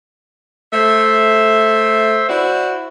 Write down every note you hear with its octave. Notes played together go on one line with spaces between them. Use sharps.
A3 C5 E5
E4 F#4 C5 D5